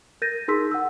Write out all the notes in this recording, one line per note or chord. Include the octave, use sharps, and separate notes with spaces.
A#4 G6 A6 A#6 D#7
D#4 G#4 A#4 C6 E6 B6
F#5 E6